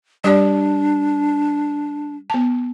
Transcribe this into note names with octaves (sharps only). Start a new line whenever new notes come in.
G3 D4 G4 D5
B3 A5